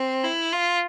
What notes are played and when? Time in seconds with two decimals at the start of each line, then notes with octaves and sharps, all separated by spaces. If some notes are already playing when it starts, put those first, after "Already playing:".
Already playing: C4
0.24 E4
0.53 F4